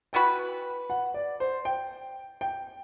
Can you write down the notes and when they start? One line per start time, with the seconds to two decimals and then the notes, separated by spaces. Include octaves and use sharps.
0.13 E3 B3 F#4 B4 G5
0.90 F#5
1.14 D5
1.40 C5
1.65 G5
2.41 G5